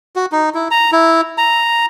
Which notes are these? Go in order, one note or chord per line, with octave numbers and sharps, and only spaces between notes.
F#4
D#4
E4
A#5
E4
A#5